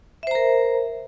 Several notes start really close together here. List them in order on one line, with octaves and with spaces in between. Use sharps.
E5 C5 A#5 A#4